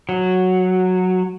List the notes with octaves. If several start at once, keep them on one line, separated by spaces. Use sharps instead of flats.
F#3